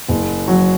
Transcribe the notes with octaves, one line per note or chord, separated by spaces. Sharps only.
F#1
F#3